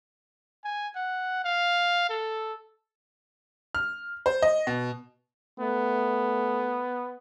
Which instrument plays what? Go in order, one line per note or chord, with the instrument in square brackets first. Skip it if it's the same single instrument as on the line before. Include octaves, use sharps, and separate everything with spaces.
[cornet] G#5
F#5
F5
A4
[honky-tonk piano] F6
C5
D#5
B2
[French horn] A3 [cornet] B3